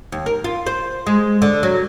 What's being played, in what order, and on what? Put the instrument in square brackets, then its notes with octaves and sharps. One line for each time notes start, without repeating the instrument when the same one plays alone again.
[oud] D#2
A#4
F4
C5
G#3
D3
F#3